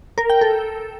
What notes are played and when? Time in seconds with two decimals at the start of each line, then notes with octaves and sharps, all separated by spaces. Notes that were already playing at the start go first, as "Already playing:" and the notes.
0.18 A#4
0.30 G5
0.41 A4